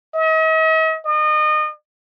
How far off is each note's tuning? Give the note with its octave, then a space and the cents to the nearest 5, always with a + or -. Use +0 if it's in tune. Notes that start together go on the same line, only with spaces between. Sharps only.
D#5 +45
D#5 -30